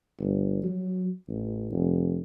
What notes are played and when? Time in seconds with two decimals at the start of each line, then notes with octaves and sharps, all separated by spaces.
0.19 G1
0.64 F#3
1.29 A1
1.72 F1